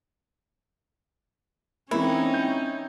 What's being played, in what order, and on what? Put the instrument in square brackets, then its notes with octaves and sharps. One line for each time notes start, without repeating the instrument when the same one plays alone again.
[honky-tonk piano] E3 G#3 A#3 [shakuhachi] C4 [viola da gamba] C#4 D#4 [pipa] E4
[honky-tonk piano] G6